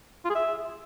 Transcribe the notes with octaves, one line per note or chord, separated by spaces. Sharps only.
F4
G#4
E5